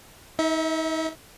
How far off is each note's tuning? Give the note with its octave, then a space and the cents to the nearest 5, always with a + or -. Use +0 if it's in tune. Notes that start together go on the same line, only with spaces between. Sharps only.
D#4 +35 E5 -25